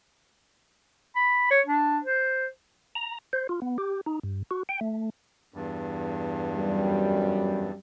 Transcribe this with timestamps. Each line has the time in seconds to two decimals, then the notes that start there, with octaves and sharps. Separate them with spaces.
1.16 B5
1.51 C#5
1.67 D4
2.04 C5
2.95 A#5
3.33 C5
3.49 F4
3.62 B3
3.78 G4
4.06 D#4
4.23 G2
4.51 F#4
4.69 G5
4.81 A3
5.54 E2 G2
6.54 F#2 G3